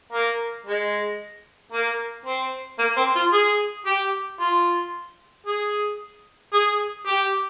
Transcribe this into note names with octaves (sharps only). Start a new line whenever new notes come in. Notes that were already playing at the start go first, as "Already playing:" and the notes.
A#3
G#3
A#3
C4
A#3
C4
F4
G#4
G4
F4
G#4
G#4
G4